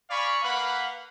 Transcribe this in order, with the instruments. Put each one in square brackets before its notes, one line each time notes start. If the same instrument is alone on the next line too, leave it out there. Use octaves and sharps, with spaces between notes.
[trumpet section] D5 F5 G#5 B5 C#6
A#3 B4 F5 F#5 B5